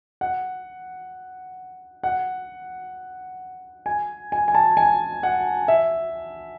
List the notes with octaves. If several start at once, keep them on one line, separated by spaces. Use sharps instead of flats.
F#5
F#5
G#5
G#5
G#5
A5
G#5
F#5
E5